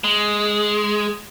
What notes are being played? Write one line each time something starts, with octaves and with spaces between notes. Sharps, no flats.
G#3